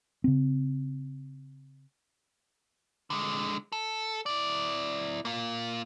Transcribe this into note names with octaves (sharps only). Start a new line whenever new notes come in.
C#3 C4
D3 G#3
A4
E4 D5
A#3 F4